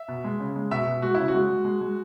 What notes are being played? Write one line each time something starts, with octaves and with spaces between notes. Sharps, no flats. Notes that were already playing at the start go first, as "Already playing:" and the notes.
Already playing: E5
B2
G#3
C#3
G#3
B2 E5
B2
G#3 F#4
C#3 E4
F#4
G#3
G#3
G#3
G#3